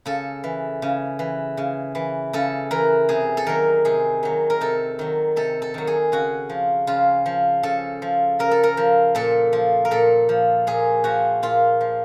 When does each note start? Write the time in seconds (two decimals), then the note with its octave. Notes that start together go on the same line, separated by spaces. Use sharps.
0.06 C#3 A4
0.44 E3
0.82 C#3
1.19 E3
1.57 C#3
1.95 E3
2.33 C#3 A4
2.71 E3 A#4
3.09 C3 G#4
3.37 A4
3.46 D#3 F#3 A#4
3.85 C3 G#4
4.23 D#3 F#3
4.50 A#4
4.61 C3 A4
4.99 D#3 F#3
5.36 C3 A4
5.62 A4
5.74 D#3 F#3
5.87 G#4
6.12 C#3 F#4
6.50 F3
6.87 C#3 F4
7.26 F3
7.63 C#3 A4
8.02 F3
8.39 C#3 A#4
8.51 A4
8.63 A#4
8.77 F3
9.15 A#2 A4
9.53 F3
9.85 A#4
9.91 A#2 A4
10.29 F3
10.67 A#2 G#4
11.04 F3 F#4
11.43 A#2 F4
11.81 F3